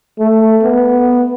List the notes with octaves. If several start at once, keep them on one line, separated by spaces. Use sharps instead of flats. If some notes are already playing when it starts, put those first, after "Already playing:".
A3
B3